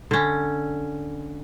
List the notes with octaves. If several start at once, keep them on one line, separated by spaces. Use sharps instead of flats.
D3 C#4